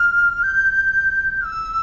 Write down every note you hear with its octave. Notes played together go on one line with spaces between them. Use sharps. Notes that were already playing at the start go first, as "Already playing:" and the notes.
Already playing: F6
G6
F6
E6